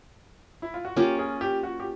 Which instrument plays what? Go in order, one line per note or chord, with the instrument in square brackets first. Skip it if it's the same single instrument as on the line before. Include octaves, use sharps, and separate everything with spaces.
[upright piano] E4
F4
F#4
[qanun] A#3 C#4 F4 [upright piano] G4
[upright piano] G#4
G4
F#4
G4